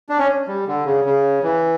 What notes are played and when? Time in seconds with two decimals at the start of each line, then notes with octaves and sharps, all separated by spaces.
0.09 D4
0.19 C#4
0.47 G3
0.67 D3
0.85 C#3
1.04 C#3
1.43 E3